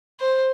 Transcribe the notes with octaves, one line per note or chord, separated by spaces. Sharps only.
C5